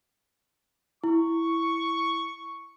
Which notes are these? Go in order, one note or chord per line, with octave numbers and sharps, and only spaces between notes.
E4 C#6